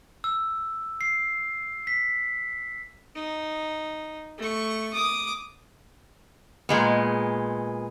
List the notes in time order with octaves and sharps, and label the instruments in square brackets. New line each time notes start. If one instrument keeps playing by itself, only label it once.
[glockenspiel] E6
C7
B6
[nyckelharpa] D#4
A3 C#6
D6 D#6
[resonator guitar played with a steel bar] A#2 G#3 B3